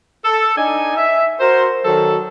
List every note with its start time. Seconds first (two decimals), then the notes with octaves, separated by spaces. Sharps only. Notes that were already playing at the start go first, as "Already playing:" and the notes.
0.24 A4
0.57 D4 D#4 D#5 G#5
0.96 E5
1.40 F#4 A#4 C5
1.85 D#3 F#3 A4